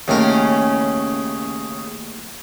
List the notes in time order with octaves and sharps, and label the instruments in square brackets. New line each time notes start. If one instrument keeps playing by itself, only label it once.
[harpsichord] D#2 A2 A#4 [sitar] C#3 C#4